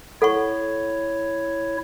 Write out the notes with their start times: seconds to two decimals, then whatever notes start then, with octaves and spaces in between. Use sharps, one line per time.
0.22 E4 A4 C#5 F#5 C#6